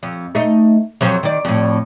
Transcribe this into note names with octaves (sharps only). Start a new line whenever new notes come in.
F2
A3 D#4
F2 F#3 C5
D#3 D5
F2 A2